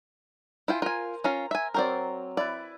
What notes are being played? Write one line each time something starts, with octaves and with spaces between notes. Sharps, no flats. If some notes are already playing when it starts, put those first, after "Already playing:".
E4 F4 C5 G5 G#5
F4 A#4 G#5
C#4 F4 F5 A#5
E5 G#5
F#3 C4 A#4 C5 D5
E4 B4 D5